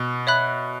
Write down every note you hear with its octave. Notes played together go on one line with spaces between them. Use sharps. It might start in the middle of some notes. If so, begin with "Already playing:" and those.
Already playing: B2
C#5 E5 B5 F#6